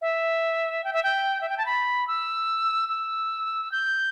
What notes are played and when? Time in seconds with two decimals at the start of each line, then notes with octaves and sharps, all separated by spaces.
0.01 E5
0.84 G5
0.93 E5
1.03 G5
1.41 E5
1.49 G5
1.58 A5
1.66 B5
2.08 E6
2.89 E6
3.72 G6